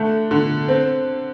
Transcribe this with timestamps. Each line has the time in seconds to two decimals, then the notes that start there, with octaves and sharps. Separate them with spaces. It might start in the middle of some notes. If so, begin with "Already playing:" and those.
Already playing: D3 A3
0.31 D3
0.68 C4